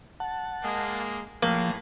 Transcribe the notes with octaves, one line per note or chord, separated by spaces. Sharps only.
F#5 A5
G#3 A#3
A2 F3 A#3 G#4